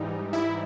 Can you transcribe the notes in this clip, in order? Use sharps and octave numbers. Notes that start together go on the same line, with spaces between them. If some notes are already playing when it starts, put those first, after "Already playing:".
Already playing: G#2 E3 G3 D#4
E4